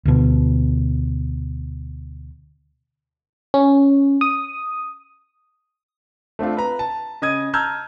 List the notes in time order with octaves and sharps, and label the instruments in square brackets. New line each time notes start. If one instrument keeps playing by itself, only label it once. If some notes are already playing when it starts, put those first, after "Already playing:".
[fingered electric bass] D2 B2
[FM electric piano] C#4
D#6
[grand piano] A3 C4 D4 F4
B4 A#5
A5
C#3 D#5 D#6 G#6 D#7
A5 A#5 E6 F6 G6 G#6